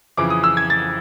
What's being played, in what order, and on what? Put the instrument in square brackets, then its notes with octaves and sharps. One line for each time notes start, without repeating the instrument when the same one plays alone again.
[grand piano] F2 C#3 E3 D6
D#6
E6
G#6
A6